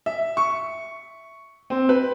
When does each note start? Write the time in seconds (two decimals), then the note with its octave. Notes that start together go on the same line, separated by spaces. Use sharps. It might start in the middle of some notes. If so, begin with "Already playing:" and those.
0.06 E5
0.37 C#6
1.70 C4
1.89 B4